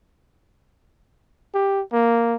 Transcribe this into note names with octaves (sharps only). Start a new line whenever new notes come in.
G4
A#3